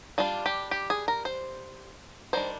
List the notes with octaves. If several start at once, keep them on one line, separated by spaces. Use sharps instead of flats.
G3 D4 F4
G4
G4
G#4
A#4
C5
D#3 G3 D4 C5